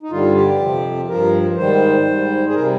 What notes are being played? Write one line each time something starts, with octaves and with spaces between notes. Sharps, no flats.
D#4
G2 D3 G3 F4
G4
F2 C3 F3
G2 F3 A#4
G#2 D#3 G3 C5
G#2 G3
G#4
C3 G3 A#4